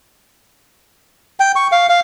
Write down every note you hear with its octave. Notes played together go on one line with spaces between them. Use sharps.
G5
C#6
F5
F5